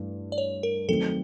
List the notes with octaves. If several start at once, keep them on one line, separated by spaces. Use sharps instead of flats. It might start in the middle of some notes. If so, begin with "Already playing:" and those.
Already playing: G2 E3 A3
D5
C#5
A#4
D#3 F#3 A3 C4 A4